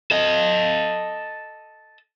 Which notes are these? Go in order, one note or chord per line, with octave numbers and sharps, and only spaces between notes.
A4 D#5